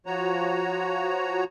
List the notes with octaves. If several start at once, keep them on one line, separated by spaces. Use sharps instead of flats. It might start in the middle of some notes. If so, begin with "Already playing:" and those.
F3 F#4 C#5 A#5